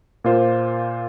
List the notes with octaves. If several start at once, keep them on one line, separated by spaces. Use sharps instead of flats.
A#2 A#3 F4 C5